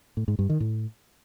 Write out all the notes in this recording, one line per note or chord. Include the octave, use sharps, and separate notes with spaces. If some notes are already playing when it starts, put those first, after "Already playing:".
A2
G#2
G2
D#3
A2